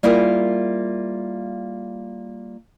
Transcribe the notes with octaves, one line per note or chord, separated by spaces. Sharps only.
G3 A#3 E4 F4 G#4 A#4